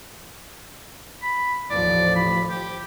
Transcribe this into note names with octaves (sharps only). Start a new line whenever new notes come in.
B5
A1 D#2 F3 D5
B5
G4